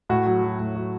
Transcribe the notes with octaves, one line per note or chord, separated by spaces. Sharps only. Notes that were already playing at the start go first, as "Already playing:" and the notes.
A2 F#4
F#3
F#3
A2
F#3